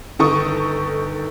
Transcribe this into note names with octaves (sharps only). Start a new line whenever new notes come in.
G1 D#3 A4 C#6 D#6